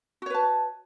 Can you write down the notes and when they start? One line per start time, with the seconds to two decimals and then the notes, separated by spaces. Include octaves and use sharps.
0.22 F#4
0.26 C#5
0.30 B4
0.34 A5